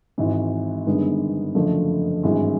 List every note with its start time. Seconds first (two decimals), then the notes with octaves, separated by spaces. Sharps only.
0.18 G#1 G#2 E3
0.86 G1 G2 D#3 G#3 B3
1.55 F#1 F#2 D3 F3 A3
2.23 G#1 G2 E3 G#3